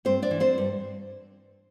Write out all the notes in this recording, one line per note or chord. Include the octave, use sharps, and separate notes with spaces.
G2 C4 C5
D4 D5
E3
C4 C5
G2